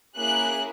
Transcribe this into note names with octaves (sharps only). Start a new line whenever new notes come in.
A#3 C#4 E4 G#4 F#6